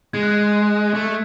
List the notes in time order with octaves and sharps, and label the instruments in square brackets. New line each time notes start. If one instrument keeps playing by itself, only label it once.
[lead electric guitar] G#3 [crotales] G#6
[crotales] F#6
G#6
[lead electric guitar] A3